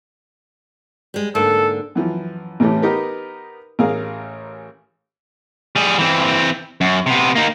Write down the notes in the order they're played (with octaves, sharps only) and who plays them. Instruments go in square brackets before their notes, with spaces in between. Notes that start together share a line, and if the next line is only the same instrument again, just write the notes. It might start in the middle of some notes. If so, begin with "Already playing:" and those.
[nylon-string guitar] G3 G#3
[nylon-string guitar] G#2 D3 A#3 [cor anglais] A4
[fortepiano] F#2 E3 F3
A1 A2 C3 E3 A3 G4
B3 D#4 G4 A#4 B4
A1 G#4 A#4 F5
[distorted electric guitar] G3 G#4
E3 C4
F#2
C3 B3
A#3 D#4